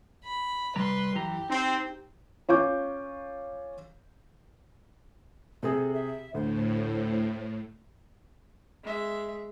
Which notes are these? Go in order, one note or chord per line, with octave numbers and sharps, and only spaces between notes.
B5
C3 G3 B4 A#5 C6
F#2 E3 G4 A#5
C4 D#4
C#4 F4 C#6 D6 G6
C3 C4 G#4 A4
E5
D2 A2 C5
G#3 E5